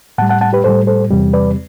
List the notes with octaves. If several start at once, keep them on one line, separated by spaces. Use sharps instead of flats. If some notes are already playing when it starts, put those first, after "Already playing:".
A2 G3 F#5 A5
F#5 A5
F#5 A5
G4 B4
A2 G3 A4 C5
A4 C5
E2 C3 G3
B4 D5